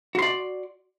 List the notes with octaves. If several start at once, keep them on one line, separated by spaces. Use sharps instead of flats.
F#4 D5 C6